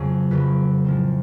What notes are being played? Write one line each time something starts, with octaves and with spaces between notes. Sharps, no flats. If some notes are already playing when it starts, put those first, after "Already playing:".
Already playing: F2 C#3 F#3 B3 G#4
F2 C#3 F#3 B4
A2 F3 G#3 C4